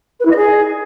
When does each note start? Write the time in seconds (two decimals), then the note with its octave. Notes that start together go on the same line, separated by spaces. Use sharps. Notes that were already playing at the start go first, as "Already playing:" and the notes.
0.20 B4
0.25 E4
0.31 D#5
0.36 G#4